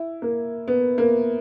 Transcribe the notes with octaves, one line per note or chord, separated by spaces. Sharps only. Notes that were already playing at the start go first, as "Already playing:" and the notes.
Already playing: E4
A#3
B3
A#3